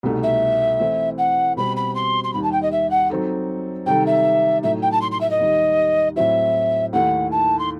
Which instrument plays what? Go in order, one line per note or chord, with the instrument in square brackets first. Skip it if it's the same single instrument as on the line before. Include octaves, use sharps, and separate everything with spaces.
[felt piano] C2 B2 A3 D#4
[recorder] E5
[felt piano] E3 A3 C4 E4
[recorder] F#5
[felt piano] B2 G3 C4 F#4 [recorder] B5
[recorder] B5
C6
C6
[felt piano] D#2 D#3 G3 [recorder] B5
[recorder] A5
G5
D#5
E5
F#5
[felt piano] F#3 C4 D#4 A4
[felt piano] C3 D#3 G3 D#4 A4 [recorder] G5
[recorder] E5
[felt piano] A2 F#3 A3 D#4 [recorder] E5
[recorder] G5
A5
C6
C6
E5
D#5
[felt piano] D#2 D#3 G3 D#4
[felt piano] A2 F#3 C4 E4 [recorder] E5
[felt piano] D#2 D#3 A3 E4 [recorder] F#5
[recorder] A5
C6